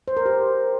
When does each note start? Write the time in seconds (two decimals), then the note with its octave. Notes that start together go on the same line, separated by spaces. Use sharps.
0.08 C5
0.17 A#4
0.26 G4